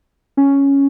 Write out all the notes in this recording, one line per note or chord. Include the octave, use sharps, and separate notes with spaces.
C#4